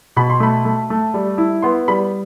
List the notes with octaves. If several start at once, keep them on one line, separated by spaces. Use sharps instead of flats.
B2 B5
C6
A3 B5
A3
A3
G3
E4
B3 C6
G3 B5